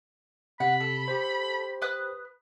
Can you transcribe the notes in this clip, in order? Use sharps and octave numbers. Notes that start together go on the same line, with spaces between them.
C3 F#5 B5
A4
G4 C5
B4 D#6 F#6